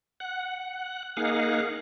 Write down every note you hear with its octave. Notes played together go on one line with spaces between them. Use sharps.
F#5
A#3 D#4 G#4 F5 F#5